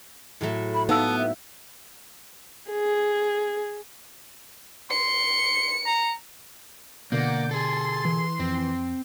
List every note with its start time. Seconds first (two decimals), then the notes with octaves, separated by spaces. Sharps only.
0.41 A2 F#3 A3
0.74 B5
0.89 B3 D#4 F5 A5 E6
1.18 E5
2.71 G#4
4.91 C6 C#7
5.86 A#5
7.12 B2 D3 A#3 D5 F#5 G6
7.51 G#4 A4 C6 A6
8.05 E3
8.39 F2 C4